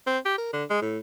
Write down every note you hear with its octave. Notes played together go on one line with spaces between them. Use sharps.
C4
G4
A#4
D3
G#3
A2